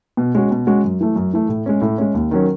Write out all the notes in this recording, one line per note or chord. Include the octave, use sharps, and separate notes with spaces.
B2
G#3 C#4 F#4
B2
G#3 C#4 F#4
F#2
E3 A3
F#2
E3 A3
A2
G#3 C#4
A2
G#3 C#4
D#2
D#3 F#3 C#4